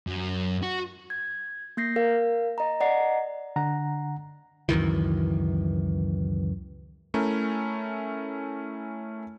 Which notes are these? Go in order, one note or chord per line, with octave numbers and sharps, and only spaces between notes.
F#2
F#4
G#6
A#3 G6 A#6 C7
A#4 F5
D#5 A#5
D5 D#5 F#5 A#5 C7
D3 F#5 A#5
C#2 F#2 D#3 E3
A3 C#4 E4 A#4